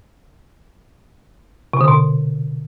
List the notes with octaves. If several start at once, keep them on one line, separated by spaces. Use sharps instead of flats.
C3
D3
B2